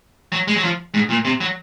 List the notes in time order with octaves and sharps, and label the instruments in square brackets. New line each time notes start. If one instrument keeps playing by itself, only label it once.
[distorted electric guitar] F#3
G#3
F#3
F3
G#2
A#2
C3
F#3